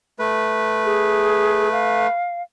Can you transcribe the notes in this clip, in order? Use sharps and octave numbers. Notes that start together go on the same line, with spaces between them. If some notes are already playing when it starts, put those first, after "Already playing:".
A3 B4
G#4
F5